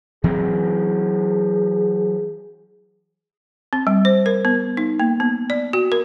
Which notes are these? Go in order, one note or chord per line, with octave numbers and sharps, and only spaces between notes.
E3 F#3 C4 G#4
C4
G3
C5
A#4
B3
D#4
A#3
B3
D5
F#4
A#4